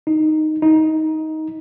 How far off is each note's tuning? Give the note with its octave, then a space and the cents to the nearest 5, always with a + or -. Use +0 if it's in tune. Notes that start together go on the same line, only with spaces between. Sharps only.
D#4 -5
D#4 +15